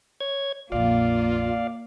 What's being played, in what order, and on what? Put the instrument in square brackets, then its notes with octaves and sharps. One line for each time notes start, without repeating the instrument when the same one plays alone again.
[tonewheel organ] C#5 G#6
[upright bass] A#1 F2 [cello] A#3 [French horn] F4 [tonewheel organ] D5 F5